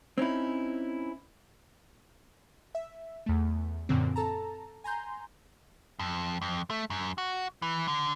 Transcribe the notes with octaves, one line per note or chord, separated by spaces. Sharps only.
C4 C#4 D#4 E4
E5
E2 A3
F#2 A#2 D3 C4
A4 A5 A#5
G#5 A#5 C6 G6
F2
F2
A3
F#2
F#4
E3
D3